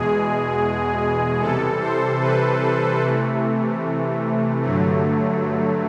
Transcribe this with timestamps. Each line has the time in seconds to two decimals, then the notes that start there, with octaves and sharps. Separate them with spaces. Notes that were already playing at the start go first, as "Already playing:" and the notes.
Already playing: E2 B2 G#3 G#4
1.40 C3 E3 G3 A4
1.80 C5
2.21 B4
3.02 C3 E3 A3
4.63 G2 D3 F#3 A3